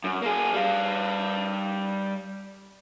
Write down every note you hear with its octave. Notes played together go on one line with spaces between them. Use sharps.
F#2
A#3 G#4
G3 F5